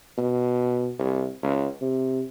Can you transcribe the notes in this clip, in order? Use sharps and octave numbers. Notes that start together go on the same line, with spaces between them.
B2
C2
C#2
C3